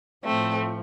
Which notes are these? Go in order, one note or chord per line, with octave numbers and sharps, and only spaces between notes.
A2 F3 A3 C4